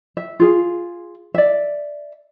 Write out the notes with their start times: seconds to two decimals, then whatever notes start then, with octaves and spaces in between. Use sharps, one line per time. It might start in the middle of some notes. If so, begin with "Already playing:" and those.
0.17 E5
0.40 F4 G#4 F5
1.34 D5 E5